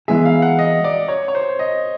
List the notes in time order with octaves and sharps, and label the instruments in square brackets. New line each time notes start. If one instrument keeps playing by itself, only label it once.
[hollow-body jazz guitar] E3 G#3 B3 E4 G#4 [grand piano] E5
[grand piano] F5
F#5
D#5
D5
C#5
C#5
C5
D#5